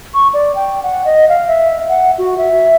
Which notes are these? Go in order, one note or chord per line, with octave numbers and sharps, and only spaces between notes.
C#6
D5
G5
F#5
D#5
F5
E5
F#5
F#4
E5